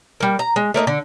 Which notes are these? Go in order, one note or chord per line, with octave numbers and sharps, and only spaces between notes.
G3 A#3
A#5
G#3
A3 A#3 C4 D#4
D3